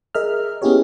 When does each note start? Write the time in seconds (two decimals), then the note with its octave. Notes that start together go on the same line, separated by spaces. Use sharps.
0.15 G#4 A#4 D#5 E5 F6
0.62 B3 C#4 E4 G4 G#4 C#5